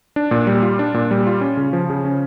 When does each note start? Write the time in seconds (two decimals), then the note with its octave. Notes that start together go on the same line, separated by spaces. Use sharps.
0.16 D4
0.31 A#2
0.47 G3
0.63 F4
0.79 D4
0.94 A#2
1.11 G3
1.27 F4
1.41 C#4
1.57 C#3
1.73 F3
1.90 C#3
2.05 C#4